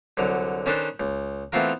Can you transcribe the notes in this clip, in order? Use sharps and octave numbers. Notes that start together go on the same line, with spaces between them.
C2 D3 F#3
D#3 C#4 D4 A4 B4 C5
C#2
E3 A3 B3 C4 F4 A#4